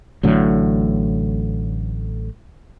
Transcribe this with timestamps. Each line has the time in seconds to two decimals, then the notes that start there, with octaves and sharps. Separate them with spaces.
0.23 A1 A2 D3 F#3